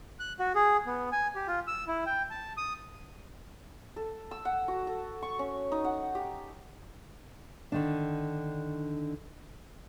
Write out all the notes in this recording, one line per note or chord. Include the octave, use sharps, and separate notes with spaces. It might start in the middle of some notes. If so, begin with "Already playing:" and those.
F#6
F#4
G#4
B3
G#5
G4
F4
E6
E4
G5
A5
D#6
A4
E6
F#5
F#4
A4
C#6
C#4
D#4
F#5
G4
D3 D#3 D4